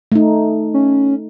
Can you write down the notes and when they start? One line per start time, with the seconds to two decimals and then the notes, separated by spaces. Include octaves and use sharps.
0.12 A3 D#4
0.74 C#4